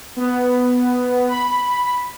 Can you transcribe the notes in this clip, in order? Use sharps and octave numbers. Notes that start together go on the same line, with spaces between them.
B3
B5